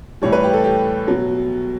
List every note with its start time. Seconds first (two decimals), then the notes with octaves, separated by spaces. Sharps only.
0.22 A2 E3 G3 C#5
0.32 B4
0.44 G4
0.53 A4
0.64 G4
1.07 B2 F#3